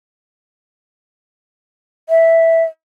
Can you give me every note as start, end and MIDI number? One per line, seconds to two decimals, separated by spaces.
2.09 2.63 76